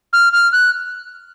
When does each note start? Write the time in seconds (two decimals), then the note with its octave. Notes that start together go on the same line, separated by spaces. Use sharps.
0.13 F6
0.33 F6
0.52 F#6